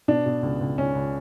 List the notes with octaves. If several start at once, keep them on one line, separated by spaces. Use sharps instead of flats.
B2 D4
B2
C#2
C#2
C#2 C#4
C#2